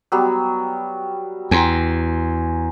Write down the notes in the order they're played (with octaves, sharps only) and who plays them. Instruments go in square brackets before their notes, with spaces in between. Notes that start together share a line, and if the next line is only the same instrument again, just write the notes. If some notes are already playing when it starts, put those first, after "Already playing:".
[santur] F#3 G3 B3
[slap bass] E2 [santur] G#5 A#5 C6